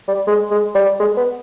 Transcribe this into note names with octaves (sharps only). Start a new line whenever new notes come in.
G3
G#3
G#3
G3
G#3
B3